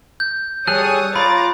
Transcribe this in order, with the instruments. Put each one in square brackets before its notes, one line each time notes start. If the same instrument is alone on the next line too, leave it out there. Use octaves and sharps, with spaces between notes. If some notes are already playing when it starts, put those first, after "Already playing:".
[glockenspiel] G6
[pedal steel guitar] G3 G#4 A4 [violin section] C#5 C#6 D#6 [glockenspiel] F#6
[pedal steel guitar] F4 [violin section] A#5 D6 A6 [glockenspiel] B5